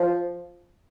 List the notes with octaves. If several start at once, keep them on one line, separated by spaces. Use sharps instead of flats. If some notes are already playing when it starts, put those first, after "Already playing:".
Already playing: F3